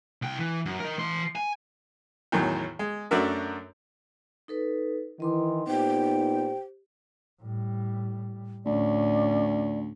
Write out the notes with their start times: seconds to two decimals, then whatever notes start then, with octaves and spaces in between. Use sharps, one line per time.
0.22 C2 G5
0.39 E3
0.66 F#2
0.80 A#4 D#5
0.98 E3 C6
1.36 G#5
2.32 E2 A2 D#3 F#3
2.79 G#3
3.11 F#2 A3 D4 F#4 A#4 E5
4.48 D#4 A4 B4
5.20 D#3 E3 D#5 C6 D6
5.68 A#2 B3 D#4 G4 C5 G5
7.41 A2 G3
8.66 D2 A2 C#4 D5